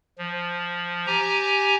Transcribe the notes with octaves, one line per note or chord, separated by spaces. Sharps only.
F3
G4 G#5 A#5